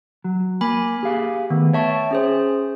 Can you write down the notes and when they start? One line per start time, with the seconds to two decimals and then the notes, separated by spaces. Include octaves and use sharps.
0.24 F#3
0.61 A#3 G#5 B5
1.03 G4 G#4 F5
1.50 D#3 A3 B3
1.73 C#5 E5 G5 A5 C#6
2.11 C#4 G#4 C5